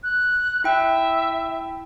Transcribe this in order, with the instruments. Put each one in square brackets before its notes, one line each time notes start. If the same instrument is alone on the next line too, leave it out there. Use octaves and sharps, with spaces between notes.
[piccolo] F#6
[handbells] E4 G5 [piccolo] E5